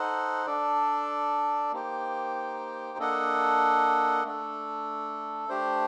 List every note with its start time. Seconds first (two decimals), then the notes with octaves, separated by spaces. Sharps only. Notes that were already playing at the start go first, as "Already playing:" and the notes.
Already playing: D#4 A4 C5 D#5 F#5
0.46 D4 A4 D5
1.72 A#3 D#4 G4 C5 G5
2.98 A#3 D4 A4 D#5 F#5
4.24 A3 D4 A4
5.49 A3 D4 G4 C5